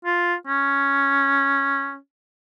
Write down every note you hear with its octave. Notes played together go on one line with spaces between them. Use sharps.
F4
C#4